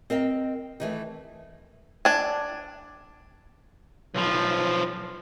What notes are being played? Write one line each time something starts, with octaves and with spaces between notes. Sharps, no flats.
C4 A#4 D#5 G5
D#3 E3 A3
D4 G#5
B1 F3